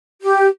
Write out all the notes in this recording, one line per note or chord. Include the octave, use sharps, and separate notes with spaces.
G4